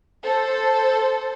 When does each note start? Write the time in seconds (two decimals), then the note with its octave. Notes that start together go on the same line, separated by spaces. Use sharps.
0.22 A4 C5